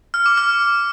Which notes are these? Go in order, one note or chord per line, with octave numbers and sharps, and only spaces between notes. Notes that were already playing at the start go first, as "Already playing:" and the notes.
F6
D6
F6